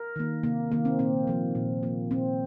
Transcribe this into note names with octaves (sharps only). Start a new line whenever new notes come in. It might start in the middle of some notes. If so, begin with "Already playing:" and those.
Already playing: A#4
D#3 A#3
C3 A#3
D#3 A#3
C4
A#2 C4
F3 A#3
A#2
F3 A#3
A#2 C4